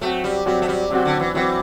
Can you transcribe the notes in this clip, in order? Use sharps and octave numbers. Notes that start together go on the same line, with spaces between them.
F#3 A3 C4 F#4
G3
F#3 G3 C4 F#4
A3
G3
C3 F#3 C4 F#4
D3
E3
E3 F#3 C4 F#4